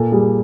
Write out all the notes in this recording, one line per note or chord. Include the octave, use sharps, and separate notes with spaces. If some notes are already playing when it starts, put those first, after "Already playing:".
Already playing: A#2 A4
G3 G#4